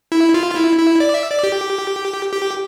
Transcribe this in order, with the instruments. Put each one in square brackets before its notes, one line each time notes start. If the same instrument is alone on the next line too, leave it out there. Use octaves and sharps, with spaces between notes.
[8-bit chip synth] E4
F4
F4
E4
E4
D5
E5
D5
G4
G4